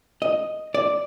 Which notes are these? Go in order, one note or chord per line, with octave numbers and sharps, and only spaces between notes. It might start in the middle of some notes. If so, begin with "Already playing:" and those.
D#5
D5